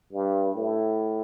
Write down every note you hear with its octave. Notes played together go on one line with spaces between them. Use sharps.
G2
A2